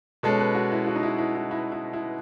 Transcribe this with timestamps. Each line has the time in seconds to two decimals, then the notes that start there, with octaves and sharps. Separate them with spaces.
0.23 B2 G#3 C#4 A4
0.39 B4
0.55 F#4
0.72 E4
0.87 F#4
0.96 D#4
1.03 E4
1.18 E4
1.35 E4
1.51 E4
1.72 E4
1.93 E4